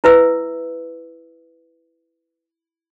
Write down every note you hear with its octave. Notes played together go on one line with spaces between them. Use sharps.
E4 B4 E5 E6